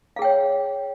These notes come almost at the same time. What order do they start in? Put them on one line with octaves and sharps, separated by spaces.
F5 G#4 G5 C#5